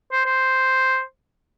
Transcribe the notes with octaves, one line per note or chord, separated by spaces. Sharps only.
C5
C5